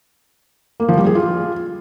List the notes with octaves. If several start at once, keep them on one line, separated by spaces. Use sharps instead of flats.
A#3
F3
G3
G#4
F4